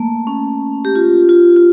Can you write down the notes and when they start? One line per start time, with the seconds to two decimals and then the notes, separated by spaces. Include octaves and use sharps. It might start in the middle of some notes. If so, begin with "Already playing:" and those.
Already playing: A3 A#3
0.27 C#4
0.85 G4
0.95 F4
1.29 F4
1.56 F4